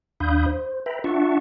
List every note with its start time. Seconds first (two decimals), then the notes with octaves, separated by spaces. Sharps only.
0.20 D#2 D4 F5 B5 D#6 G6
0.46 C5
0.86 B4 E5 G5 A#5 B5
1.04 D4 F4 E5 F#5 A5 C#6